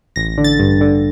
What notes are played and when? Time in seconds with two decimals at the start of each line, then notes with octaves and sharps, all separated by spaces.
0.16 A1 A#6
0.38 D3
0.44 A6
0.59 G2
0.81 D3